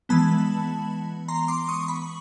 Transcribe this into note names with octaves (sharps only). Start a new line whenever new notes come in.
E3 G#3 B3 A5 B5
A#5 C6
C6 D6
C#6 D#6
B5 C#6